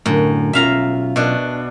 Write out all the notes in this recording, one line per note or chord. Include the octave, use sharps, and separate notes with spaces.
F#2 A2 D3
B1 C#4 F4 E5 F5 A#5
B2 D4